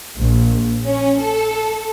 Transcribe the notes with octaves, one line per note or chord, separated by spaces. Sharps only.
A#1
C#4
A4